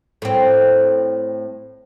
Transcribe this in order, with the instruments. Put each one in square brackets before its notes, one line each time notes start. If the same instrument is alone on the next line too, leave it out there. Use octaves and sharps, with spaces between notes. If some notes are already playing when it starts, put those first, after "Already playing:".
[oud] A2 C4